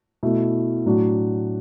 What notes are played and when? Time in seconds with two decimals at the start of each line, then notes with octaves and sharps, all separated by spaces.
0.23 B2 A3 E4
0.85 A2 F#3 D4 F#4